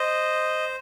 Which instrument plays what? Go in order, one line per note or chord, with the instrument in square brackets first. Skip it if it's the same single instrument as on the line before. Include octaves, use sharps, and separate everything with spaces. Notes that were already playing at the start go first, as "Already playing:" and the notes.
Already playing: [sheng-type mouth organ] C5 D#5